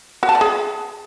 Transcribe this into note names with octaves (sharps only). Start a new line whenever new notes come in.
F#4
A5
D5
G#4